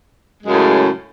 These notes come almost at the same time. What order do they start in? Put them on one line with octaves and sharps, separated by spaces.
G#3 F#2 C#3 A2